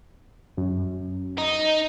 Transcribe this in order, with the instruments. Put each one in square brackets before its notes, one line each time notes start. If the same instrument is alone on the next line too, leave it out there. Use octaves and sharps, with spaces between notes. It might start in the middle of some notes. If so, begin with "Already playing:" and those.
[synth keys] F#2
[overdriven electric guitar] D#4